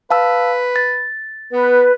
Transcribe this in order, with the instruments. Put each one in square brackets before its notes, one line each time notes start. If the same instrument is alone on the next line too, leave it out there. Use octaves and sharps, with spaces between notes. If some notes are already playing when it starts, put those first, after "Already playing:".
[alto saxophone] B4 [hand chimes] F5 A5 E6
[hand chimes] A6
[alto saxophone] B3 [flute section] B4